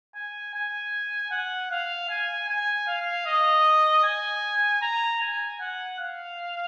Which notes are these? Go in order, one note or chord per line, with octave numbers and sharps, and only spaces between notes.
G#5
G#5
F#5
F5
G#5
G#5
F5
D#5
G#5
A#5
G#5
F#5
F5